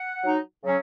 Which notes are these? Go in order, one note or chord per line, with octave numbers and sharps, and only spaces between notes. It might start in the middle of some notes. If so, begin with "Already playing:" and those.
Already playing: F#5
F#3 D#4
C#3 F#3 C#4